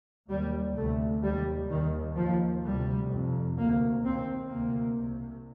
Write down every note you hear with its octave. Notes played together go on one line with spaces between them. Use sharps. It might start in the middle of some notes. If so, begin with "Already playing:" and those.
D#2 G3
D2 C3 A3
D#2 G3
D#2 D#3
D#2 F3
D2 C3 G3
F2 C3
D2 C3 A#3
D#2 C4
D2 C3 A#3
C2 C3